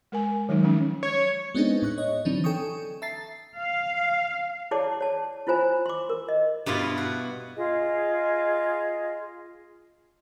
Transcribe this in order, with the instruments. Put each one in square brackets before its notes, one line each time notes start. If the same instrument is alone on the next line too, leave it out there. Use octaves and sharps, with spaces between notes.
[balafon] G#3 A#4 G#5
D#3 F#3 G#3 D#4
F3 G#3 C#4
[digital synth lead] C#5
[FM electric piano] G#3 B3 C4 D4 D#4 G#4
A2 C#6 F#6
C#5 D#5
D3 E3 F#3 C4 D4 D#4
A4 G5 G#5 C#6 D#6
E5 A5 A#5 A6 C7
[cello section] F5
[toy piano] E4 G#4 C#5 D5 A5 D6
C#5 A5
E4 F4 C5 G#5 A#5
C6 D6
A#4
D#5
[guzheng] G2 B2 E4 F4
F#4
[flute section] F4 G#4 D#5